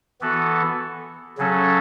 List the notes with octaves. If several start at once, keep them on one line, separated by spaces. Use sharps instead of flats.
E3 B3 F#4 A4
C#3 F#3 C#4 A4